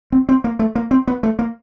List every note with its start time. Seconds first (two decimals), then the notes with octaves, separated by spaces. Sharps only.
0.12 C4
0.29 C4
0.44 A#3
0.59 A3
0.75 A#3
0.91 C4
1.07 B3
1.23 A3
1.39 A#3